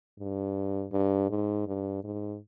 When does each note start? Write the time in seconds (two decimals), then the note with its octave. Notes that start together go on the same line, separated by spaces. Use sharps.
0.19 G2
0.92 G2
1.30 G#2
1.67 G2
2.04 G#2